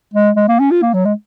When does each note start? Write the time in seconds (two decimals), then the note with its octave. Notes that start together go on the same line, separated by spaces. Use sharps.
0.14 G#3
0.36 G#3
0.48 A#3
0.60 C#4
0.71 F4
0.82 A#3
0.94 F#3
1.05 G#3